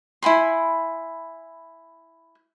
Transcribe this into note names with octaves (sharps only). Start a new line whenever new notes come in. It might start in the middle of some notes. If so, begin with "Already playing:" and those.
E4 G#5 B5 C6